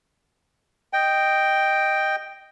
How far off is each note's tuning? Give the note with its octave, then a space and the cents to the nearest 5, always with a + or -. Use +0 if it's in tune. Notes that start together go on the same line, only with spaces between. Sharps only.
D#5 -5 G5 +0